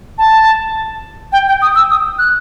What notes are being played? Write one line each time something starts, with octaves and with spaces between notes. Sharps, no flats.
A5
G5
G5
D#6
E6
D#6
F#6